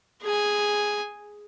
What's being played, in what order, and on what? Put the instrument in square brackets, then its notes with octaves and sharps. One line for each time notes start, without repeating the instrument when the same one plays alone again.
[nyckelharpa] G#4 G#5